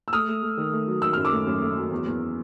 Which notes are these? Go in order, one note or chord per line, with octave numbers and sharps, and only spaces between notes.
E6
A3 D#6 F6
A3
A3
D#3
A3
F#3
D#3 E6
F#2 F6
D6 E6
A3
F#2
A3
F#3
E2
E2